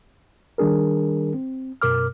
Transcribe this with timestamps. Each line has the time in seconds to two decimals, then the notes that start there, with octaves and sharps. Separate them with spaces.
0.58 D#3 G3 D4 G#4 A#4
1.34 C4
1.82 F#2 B2 A#4 D6 F6